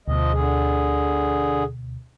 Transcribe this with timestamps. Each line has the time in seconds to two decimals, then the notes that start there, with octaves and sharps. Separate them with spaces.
0.08 D2 B2 F3 D#5
0.33 D3 G#4